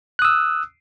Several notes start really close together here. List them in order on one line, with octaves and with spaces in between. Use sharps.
F#6 D#6 E6